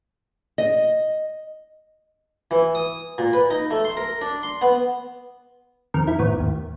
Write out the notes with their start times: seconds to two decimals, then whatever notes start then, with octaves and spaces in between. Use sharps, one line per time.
0.58 D#5
2.51 E3
2.75 D#6
3.18 A#2
3.33 B4
3.51 D#4
3.71 A3
3.85 C6
3.97 A#4
4.21 D4
4.43 C6
4.62 B3
5.94 F2 D#3 A#4
6.07 E4
6.19 G#1 A2 B3
6.40 D#2